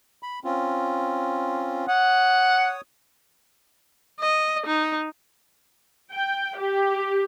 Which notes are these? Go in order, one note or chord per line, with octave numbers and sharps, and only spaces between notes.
B5
C4 C#4 F4
C#5 F#5 D#6
D#5
D#4
G5
G4